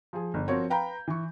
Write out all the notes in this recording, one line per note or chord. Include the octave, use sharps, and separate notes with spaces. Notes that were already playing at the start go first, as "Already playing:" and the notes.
F3 G#4
G1
F3 C4 F#4 A#4 C#5
B4 F5 G5 A#5 B5 G6
E3 C#6